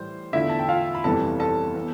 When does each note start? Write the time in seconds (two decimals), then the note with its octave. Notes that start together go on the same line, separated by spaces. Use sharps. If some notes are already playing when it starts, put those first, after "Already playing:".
Already playing: A2 E3 G3 C5
0.33 E2 D3 A3 D4 E4 F4 E5
0.49 A5
0.59 G5
0.69 F4 F5
0.95 B5
1.04 G1 F2 C3 E3 G3 A4 A5
1.40 A4 A5
1.74 E3 B3